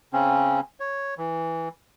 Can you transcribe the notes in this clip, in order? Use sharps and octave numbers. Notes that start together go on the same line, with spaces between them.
C#3 C4 C#4
C#5
E3